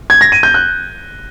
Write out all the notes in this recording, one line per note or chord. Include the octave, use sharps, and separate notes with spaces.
G#6
A#6
D#7
G6
F#6